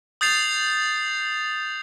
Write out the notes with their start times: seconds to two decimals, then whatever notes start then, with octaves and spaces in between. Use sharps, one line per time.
0.21 D#6 G6 A6 C7 F7